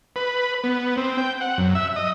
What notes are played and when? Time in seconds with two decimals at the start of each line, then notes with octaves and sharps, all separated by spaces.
0.16 B4
0.64 B3
0.97 C4
1.18 G5
1.41 F#5
1.58 F#2
1.75 E5
1.96 D#5